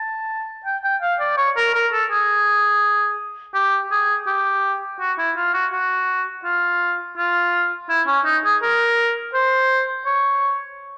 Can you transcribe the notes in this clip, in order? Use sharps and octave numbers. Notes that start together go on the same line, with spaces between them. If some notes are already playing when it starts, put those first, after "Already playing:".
Already playing: A5
G5
G5
F5
D5
C#5
A#4
A#4
A4
G#4
G4
G#4
G4
F#4
E4
F4
F#4
F#4
F4
F4
E4
C#4
D#4
G#4
A#4
C5
C#5